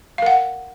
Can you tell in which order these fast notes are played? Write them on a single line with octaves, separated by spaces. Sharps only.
F5 A#4 F#5